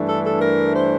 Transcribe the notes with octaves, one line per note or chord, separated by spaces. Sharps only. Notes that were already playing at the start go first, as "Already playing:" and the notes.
Already playing: G2 E3 A3 D4
A4
A4
A#4
C5